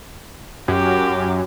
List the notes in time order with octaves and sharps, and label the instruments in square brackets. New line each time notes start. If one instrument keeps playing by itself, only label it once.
[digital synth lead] F#2 [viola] F#4 G4